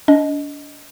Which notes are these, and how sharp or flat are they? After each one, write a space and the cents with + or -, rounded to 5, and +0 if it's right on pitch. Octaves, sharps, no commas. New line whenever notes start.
D4 -35 D#5 +0